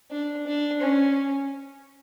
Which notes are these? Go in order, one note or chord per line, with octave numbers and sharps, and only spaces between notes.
D4
D4
C#4